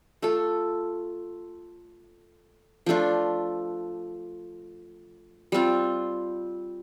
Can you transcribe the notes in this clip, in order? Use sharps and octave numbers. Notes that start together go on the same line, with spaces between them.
A3 F4 A4
F3 A3 D4 F4
G3 C4 F4